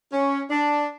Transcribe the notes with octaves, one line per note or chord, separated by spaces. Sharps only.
C#4
D4